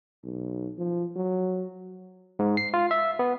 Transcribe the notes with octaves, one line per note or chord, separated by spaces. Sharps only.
B1
F3
F#3
G#2
C7
F4
E5
B3